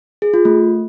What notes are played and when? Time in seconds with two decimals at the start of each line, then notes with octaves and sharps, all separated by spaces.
0.22 G#4
0.34 F4
0.45 A3